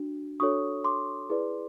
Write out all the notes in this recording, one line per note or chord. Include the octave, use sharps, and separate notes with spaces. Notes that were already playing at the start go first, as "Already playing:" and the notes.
Already playing: D4 F#4
D4 F#4 A4 C#5 C#6 D#6
C6 D6
E4 G#4 B4 D5